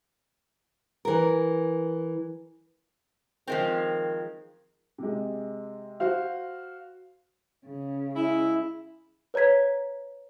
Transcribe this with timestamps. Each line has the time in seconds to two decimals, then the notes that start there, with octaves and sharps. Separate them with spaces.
1.05 E3 A#4
3.47 D#3 F3 G#3 C4
4.98 C3 G#3
6.00 F#4 C5 F5
7.65 C#3
8.14 G#3 E4
9.34 B4 C#5 A#5 G#6 B6